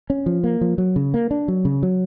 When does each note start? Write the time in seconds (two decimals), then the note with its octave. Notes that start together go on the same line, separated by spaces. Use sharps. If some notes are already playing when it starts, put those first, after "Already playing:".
0.10 C#4
0.26 F3
0.44 A#3
0.61 F3
0.78 F#3
0.96 C#3
1.14 A#3
1.31 D4
1.48 F#3
1.65 C#3
1.83 F#3